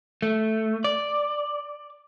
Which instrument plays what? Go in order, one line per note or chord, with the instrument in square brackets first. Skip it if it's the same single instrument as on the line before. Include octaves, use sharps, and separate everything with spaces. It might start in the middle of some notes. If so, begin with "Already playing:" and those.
[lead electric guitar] A3
D5